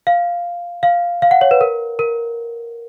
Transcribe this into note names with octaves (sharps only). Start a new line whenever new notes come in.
F5
F5
F5
F#5
C#5
B4
A#4
A#4